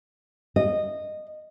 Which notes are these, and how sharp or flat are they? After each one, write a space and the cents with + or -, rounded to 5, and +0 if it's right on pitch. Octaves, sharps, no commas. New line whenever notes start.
D#5 -15